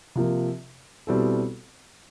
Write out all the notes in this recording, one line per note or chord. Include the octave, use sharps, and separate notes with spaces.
C3 F3 A#3
B2 G3 C4 E4 A4